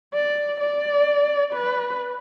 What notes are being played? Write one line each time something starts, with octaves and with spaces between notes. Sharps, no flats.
D5
D5
B4